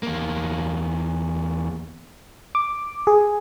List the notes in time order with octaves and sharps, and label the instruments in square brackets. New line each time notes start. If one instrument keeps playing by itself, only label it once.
[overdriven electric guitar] E2 A#3
[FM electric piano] D6
G#4